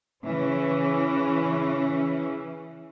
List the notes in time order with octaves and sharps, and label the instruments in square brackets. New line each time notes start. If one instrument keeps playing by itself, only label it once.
[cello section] C#3 E3 C#4